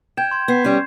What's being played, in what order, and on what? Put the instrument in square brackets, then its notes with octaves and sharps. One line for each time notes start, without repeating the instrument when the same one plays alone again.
[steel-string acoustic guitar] G5 [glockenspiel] G6 G#6 E7
[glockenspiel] C6 G#6
[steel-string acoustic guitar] B3 [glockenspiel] G#6 C7
[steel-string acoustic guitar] G3 C#4